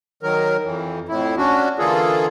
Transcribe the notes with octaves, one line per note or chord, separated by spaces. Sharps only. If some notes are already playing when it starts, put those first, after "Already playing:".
D#3 F#3 A#4
F2 E3
F2 A2 E4
C#4 D4 F#4
D3 E3 A#3 F4 G#4 A4